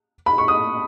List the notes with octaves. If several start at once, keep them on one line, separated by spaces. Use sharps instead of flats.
B5
C#6
D#6